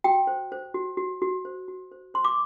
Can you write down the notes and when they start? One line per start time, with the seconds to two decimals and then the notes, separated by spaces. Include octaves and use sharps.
0.04 F#4 G5
0.27 C5
0.52 C5
0.74 F#4
0.97 F#4
1.22 F#4
1.45 C5
1.68 F#4
1.92 C5
2.14 C5 C6
2.25 D6